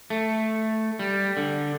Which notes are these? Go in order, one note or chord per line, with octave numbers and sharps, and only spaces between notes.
A3
G3
D3